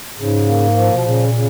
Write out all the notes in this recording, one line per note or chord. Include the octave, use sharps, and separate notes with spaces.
G#2 C#3
A#3
F3
B2
A#2 C#3
C#3